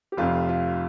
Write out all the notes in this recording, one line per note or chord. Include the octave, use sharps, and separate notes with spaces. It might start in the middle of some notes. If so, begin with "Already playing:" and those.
G4
F1 F2 C3 F4
F4